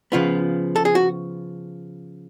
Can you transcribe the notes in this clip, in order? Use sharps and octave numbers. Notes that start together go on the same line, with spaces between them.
C#3 F3 B3 F4
A4
G#4
F#4